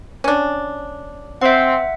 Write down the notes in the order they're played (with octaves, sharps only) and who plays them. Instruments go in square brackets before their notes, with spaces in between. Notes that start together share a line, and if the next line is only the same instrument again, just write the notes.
[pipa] C#4 D4
[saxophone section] C4 [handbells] E5 F#5